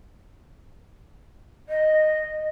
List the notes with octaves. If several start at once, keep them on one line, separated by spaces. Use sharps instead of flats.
D#5